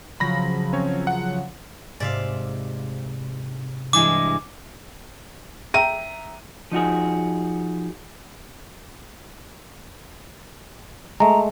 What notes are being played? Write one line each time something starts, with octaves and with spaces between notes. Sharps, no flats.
C#3 F3 F#3 B5 A#6
C4 C#4 C#5
F#5
G#2 C3 D5 E5 F5
G2 E3 G#3 D6
E5 G5 A#5 D#7
F3 D#4 F#4 G#4
G#3 A3 A#5